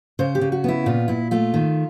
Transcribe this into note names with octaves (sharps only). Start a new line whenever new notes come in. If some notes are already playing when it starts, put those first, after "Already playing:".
C#3 C5
G4
C#3
F#4
B3 E4
A#2 F4
A#2 E4
A3 F4
D#3